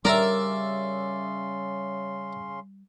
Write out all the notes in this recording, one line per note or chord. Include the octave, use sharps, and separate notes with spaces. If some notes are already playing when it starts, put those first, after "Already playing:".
C#3 G3 C#4 A#4 D5 E5 A#5 C6